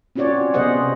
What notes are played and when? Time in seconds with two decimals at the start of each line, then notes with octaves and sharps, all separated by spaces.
0.15 C4 C#4 F4 F#4 C#5 D5
0.54 C3 B3 G#4 C5 D#5 F#5